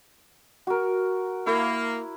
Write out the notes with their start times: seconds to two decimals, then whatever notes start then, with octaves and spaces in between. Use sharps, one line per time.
0.67 F#4 A#4
1.47 A#3 E4